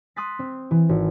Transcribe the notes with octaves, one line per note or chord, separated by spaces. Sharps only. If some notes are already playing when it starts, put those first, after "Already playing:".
C6 D#6 F#6 A6 B6
C4
E3
G#1